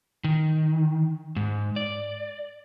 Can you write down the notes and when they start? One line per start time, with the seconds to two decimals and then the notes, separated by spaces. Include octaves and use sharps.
0.24 D#3
1.36 G#2
1.76 D5